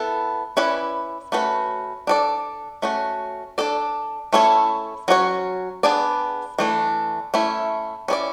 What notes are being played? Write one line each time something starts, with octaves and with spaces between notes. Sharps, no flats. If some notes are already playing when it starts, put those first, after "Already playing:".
Already playing: B3 E4 A4
C#4 E4 B4 D5
A3 C#4 F#4 B4
D4 A4 D5
A3 C#4 F#4
D4 A4 D5
A3 C#4 E4 A4 C#5
F#3 C#4 F#4 C#5
B3 D4 G#4 D5
E3 A3 D4
A3 C#4 E4
C#4 E4 G#4 D5